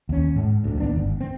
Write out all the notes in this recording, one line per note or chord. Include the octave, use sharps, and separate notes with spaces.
D#2 C#4
G#2
D1 D2
D#2 B3 D4
G1
C4